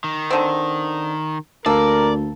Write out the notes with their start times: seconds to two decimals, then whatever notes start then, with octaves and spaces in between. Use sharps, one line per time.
0.04 D#3
0.30 D3 C4
1.66 D2 A#3 A4 A#4 D5